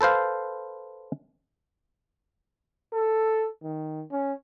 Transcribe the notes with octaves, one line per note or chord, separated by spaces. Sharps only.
A4 B4 C5 F5
A4
D#3
C#4